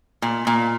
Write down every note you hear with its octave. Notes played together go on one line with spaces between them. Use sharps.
A#2
A#2